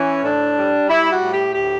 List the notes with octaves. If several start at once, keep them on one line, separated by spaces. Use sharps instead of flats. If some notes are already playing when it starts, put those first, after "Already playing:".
Already playing: E3 C#4
A2 D4
G3
G3 E4
F#4
A2
G4
D2 G4